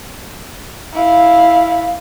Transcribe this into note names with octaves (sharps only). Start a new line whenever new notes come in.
E4 F5